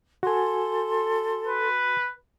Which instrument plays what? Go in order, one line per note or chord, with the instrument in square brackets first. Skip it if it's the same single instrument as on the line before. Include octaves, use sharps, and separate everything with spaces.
[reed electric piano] F#4 G#5 [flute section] A4 C6
[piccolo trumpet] B4